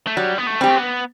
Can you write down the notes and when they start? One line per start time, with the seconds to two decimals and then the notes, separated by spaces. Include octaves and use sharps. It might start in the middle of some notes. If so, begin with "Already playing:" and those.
0.07 A3
0.17 F#3 G3
0.38 B3
0.47 A3
0.61 G3 C4 G4
0.69 A3
0.76 B3